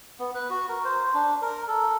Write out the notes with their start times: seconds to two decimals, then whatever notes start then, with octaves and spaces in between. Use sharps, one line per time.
0.19 B3
0.34 B4
0.50 F#4
0.69 A#4
0.85 C5
1.14 D4
1.42 A#4
1.68 A4